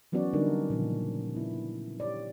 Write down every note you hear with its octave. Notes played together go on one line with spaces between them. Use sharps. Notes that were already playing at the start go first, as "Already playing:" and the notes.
E3 F#3 B3 C#4 F#4 D5
D3 G3 D4 D#4 A#4
A#2 C#3 F3
B3 E4
G4 C#5 D5